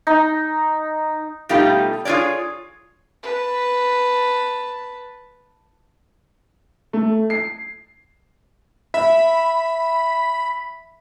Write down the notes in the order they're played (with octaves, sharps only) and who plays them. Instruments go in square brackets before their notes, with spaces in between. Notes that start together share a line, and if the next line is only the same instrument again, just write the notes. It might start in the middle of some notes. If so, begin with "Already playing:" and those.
[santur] D#4
[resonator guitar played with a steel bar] B2 G3 A3 D#4 F4 G4
F4 G#4 A#4 C#5 D5
[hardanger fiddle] B4 A5
[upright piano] A3
C7
[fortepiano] E5 [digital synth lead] B5